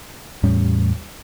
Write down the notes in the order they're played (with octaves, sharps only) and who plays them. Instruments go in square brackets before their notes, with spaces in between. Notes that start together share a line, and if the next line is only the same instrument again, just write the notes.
[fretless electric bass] E2 A2 G3 C#4